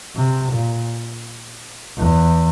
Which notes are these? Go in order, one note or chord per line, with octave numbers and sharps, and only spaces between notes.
C3
A#2
E2